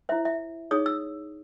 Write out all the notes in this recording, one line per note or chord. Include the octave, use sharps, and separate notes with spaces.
E4 C5 E5
E5
D#4 G#4 C#5 D#6
E6